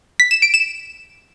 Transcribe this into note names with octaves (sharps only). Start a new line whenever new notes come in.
B6
E7
D7
E7